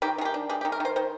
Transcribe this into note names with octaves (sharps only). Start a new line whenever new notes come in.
D#3 G4
D#3 G#4
G4
D4
G#3 G4
G4
D#3
A#4
D#3 C5
D#3 C5